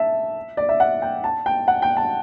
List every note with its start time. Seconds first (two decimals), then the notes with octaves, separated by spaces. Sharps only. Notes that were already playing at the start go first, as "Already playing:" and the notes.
Already playing: E5 A5
0.57 D5
0.69 E5
0.80 F#5
1.02 G5
1.24 A5
1.46 G5
1.68 F#5
1.82 G5
1.97 A5